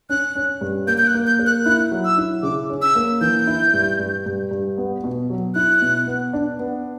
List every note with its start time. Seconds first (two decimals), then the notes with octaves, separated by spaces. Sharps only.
0.09 C#4 F#6
0.35 C#4
0.61 G2
0.87 A#3 G6
0.98 G6
1.07 F#6
1.14 A#3
1.27 G6
1.39 A#4
1.46 F#6
1.65 E4 F#6
1.91 F#3
2.05 E6
2.18 E4
2.43 C#3 D6
2.70 C#4
2.82 E6
2.95 A#3
3.21 E3 G6
3.47 E4
3.74 G2
3.99 G2
4.26 G2
4.51 G2
4.77 B3
5.04 B2
5.30 F#3
5.55 E4 F#6
5.81 B2
6.07 B3
6.33 D4
6.59 B3